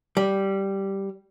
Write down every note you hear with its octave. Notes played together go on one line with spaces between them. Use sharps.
G3